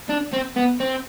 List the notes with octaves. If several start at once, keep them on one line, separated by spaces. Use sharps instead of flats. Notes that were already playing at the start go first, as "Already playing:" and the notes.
D4
C4
B3
C4